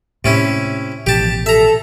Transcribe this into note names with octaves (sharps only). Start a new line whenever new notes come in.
A2 C3 A#3 C#4 E4
A1 B2 F3 G4 A5
A4 E5 A#5